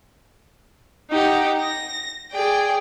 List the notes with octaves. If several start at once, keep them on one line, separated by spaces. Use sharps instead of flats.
D#4 G4 F#5
A#6
G#4 D5 G5